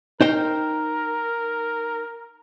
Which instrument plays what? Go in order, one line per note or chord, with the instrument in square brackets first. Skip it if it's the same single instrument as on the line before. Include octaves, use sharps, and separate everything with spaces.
[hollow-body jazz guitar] D#4 C5 G5 [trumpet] A#4